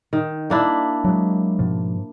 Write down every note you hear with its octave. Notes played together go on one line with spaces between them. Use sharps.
D#3
A#3 D4 E4
F#3 G#3
G#2 B2 F3